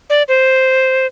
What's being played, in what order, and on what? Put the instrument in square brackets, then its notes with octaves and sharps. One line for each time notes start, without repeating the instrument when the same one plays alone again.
[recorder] D5
C5